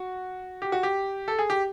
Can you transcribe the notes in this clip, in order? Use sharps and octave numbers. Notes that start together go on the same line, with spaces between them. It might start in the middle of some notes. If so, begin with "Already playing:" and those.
Already playing: F#4
G4
F#4
G4
A4
G#4
G4